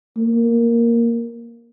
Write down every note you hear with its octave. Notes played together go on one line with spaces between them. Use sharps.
A#3